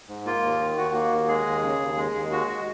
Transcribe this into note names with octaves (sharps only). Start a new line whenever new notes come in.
G#2
A#3 F4
D#2
D#3
D#2 F#4
A#3
D#2
G#3 G#4
D#2
C#3
D#2
G#3
D#2
G#3 F#4
F#4